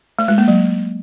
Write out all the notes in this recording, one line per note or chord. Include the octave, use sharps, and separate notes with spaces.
A3
G#3
A#3
F#3